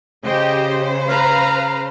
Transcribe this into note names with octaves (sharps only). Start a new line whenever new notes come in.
C#3 G4 C5 D#5 G5
B4 F5 A#5